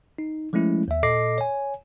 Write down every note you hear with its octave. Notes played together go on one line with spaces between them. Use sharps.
D#4
F3 G#3 A3 C#4 E4
D#2 E5
A#2 A4 D#5 D6 A#6 C7
C#5 G#5